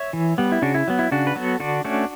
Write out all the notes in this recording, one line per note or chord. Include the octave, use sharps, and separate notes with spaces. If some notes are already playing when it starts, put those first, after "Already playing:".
Already playing: C#5 E5
E3
G3 B3
E4
C#3 D4 F#4
E4
F#3 B3
E4
C#3 D4 F#4
B4
F#3 B3 F#4 A4
D3 D4 F#4
A3 C#4 D4 F#4